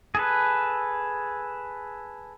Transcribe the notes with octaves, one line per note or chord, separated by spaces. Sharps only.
G#4 A4 B4